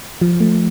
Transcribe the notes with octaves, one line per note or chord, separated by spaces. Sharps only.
F3
A3